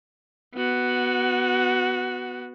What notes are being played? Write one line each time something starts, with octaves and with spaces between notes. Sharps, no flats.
B3 F#4